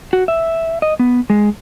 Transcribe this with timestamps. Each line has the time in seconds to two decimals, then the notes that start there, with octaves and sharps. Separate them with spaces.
0.13 F#4
0.28 E5
0.82 D#5
0.99 B3
1.30 G#3